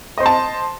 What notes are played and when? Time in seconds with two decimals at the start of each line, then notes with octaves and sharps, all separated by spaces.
0.18 D#5
0.20 C5
0.23 C6
0.26 A5